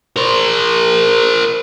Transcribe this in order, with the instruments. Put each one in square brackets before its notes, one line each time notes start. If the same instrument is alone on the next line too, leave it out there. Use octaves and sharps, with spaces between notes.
[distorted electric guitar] A#4 C5